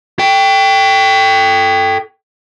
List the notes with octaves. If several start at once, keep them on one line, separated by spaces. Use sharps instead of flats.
A4 G5